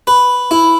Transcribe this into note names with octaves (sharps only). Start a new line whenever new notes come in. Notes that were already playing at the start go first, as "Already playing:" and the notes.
B4
E4